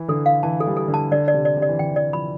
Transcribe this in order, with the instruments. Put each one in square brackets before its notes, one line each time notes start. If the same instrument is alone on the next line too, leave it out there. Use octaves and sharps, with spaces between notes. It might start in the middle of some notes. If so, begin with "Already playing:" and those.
Already playing: [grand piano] E3
[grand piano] D3 [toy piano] A4
[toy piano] F5
[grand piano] E3 [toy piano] A5
[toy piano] A4
[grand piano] G3
[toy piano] A4
[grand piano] D3
[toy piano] A5
[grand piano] D3 [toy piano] D5
[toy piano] D5
[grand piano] C3
[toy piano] D5
[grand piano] C3
[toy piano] D5
[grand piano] E3
[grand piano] D3 [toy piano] G5
[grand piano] E3 [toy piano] D5
[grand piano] F3 [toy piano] B5